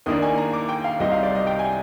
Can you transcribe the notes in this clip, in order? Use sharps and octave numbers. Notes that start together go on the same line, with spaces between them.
D#2 D#3 A#3 D4 D#6
G#5
A#5
D6
G5
F5
C2 C3 G3 C4 D#4 D#5
F5
D5
D#5
G5
G#5